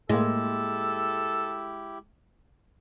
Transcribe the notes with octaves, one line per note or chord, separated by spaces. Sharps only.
A2 G#3 A#3 E4 G4 A4